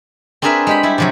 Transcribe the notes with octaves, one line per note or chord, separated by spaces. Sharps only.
C4 D4 G#4 A#4 B4 E5
G#3 G4 B5
G3 E4
C3 F3 F#3